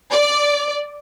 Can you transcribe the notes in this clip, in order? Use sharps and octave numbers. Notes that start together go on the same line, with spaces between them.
D5